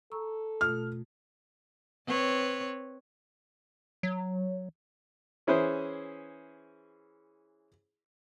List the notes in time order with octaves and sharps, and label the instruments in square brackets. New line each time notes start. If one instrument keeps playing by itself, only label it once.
[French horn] A4 [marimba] A#5 C#6 E6
[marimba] B2 A3 F4 [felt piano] F6
[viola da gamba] C4 B4 C#5
[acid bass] F#3
[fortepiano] E3 C#4 E4 G#4 B4 C5